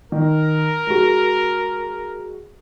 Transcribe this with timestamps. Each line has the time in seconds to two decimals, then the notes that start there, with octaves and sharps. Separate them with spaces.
0.12 D#3 A#4
0.87 G#3 F#4